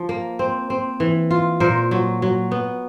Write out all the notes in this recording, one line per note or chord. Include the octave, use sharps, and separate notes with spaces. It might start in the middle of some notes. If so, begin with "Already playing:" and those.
Already playing: F3
A#3
C4
C4
E3
F4
A#2 A#4 C5
F#3
F#3
B3